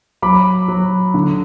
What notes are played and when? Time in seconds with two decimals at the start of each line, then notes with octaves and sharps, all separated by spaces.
0.22 F#3 B5 D6
0.68 F#3
1.14 D3